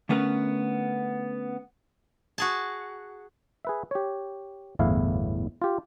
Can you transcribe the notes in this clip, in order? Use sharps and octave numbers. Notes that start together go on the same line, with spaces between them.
D3 A3 B3 C#4 A#4 B4
F#4 G#4 A5
G#4 B4 E5
G4 C#5
G1 E2 A2 E4 F5 F#5
F4 G4